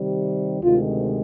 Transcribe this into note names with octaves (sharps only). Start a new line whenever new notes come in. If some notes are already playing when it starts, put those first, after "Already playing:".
Already playing: C3 D#3 G3
D2 C3 D#3 G#3 F4